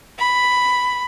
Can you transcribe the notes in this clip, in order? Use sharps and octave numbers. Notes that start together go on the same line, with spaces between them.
B5